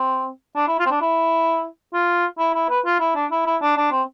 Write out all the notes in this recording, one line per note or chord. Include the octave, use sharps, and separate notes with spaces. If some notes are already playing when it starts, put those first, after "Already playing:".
Already playing: C4
D4
E4
F4
C4
D4
E4
F4
E4
E4
B4
F4
E4
D4
E4
E4
D4
D4
C4